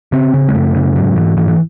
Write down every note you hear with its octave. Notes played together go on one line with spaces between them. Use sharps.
C#3 C4
C#3
G#3
F#2 A3
C#3
G#2 F#3
G#2 E3
G#2 E3
E3